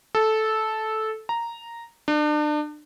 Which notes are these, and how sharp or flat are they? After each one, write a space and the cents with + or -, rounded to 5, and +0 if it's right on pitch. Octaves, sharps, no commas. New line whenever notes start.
A4 -10
A#5 -5
D4 +35